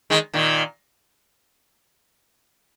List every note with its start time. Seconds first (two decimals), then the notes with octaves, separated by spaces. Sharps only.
0.10 D#3 G#3
0.33 A#2 D#3